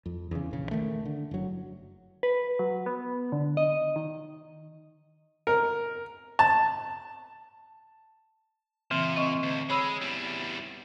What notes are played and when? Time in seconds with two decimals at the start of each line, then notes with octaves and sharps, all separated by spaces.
0.06 F2
0.31 E2 C#3
0.51 A#1 C#3
0.71 D#3 A3
1.05 D3
1.31 F#1 F#3
2.23 B4
2.59 F#3
2.86 B3
3.32 D3
3.57 D#5
3.96 D#3
5.47 A#4
6.39 A5
8.91 A#2 C#3 E3 C4
9.16 C4 D#5 C#6
9.43 D2
9.69 G#3 C#5 B5 E6
10.01 E2 G3